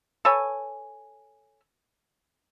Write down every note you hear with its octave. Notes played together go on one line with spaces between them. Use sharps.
A4 B4 C#5 G#5